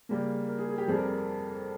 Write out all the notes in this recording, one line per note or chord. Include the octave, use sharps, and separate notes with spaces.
C#3 G3 A#3
A#4
G#4
G#4
G4
F2 C3 G3 G#4
A#4